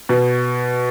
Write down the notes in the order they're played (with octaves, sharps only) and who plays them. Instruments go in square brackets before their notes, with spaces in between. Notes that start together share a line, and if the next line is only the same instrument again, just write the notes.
[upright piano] B2